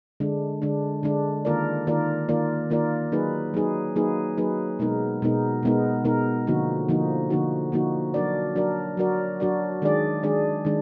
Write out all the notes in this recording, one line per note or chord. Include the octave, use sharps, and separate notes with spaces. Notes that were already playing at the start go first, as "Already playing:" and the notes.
D3 G#3 D4
D3 G#3 D4
D3 G#3 D4
D#3 A#3 F4 A#4 D5
D#3 A#3 F4 A#4 D5
D#3 A#3 F4 A#4 D5
D#3 A#3 F4 A#4 D5
F#3 A#3 D#4 G#4 B4
F#3 A#3 D#4 G#4 B4
F#3 A#3 D#4 G#4 B4
F#3 A#3 D#4 G#4 B4
B2 G#3 B3 D#4 A#4
B2 G#3 B3 D#4 A#4
B2 G#3 B3 D#4 A#4
B2 G#3 B3 D#4 A#4
D3 F3 A#3 D#4 F#4
D3 F3 A#3 D#4 F#4
D3 F3 A#3 D#4 F#4
D3 F3 A#3 D#4 F#4
F#3 D4 F#4 A#4 D5
F#3 D4 F#4 A#4 D5
F#3 D4 F#4 A#4 D5
F#3 D4 F#4 A#4 D5
D#3 G#3 D4 G#4 D5
D#3 G#3 D4 G#4 D5
D#3 G#3 D4